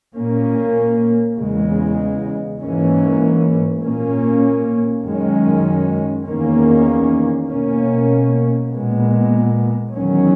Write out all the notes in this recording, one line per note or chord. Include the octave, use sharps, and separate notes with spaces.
A#2 A#3 C#4
E2 C#3 G#3
G#2 E3 A#3 C#4
A#2 A#3 C#4
F#2 D#3 G#3 C#4
E2 D#3 A#3 C#4
B2 A#3 C#4
A#2 G#3 B3
E2 D#3 F#3 C#4